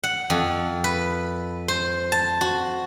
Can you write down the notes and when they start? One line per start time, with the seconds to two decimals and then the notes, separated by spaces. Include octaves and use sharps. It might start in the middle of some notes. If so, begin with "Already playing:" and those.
0.04 F#5
0.30 F2
0.84 B4
1.68 C5
2.12 A5
2.41 F#4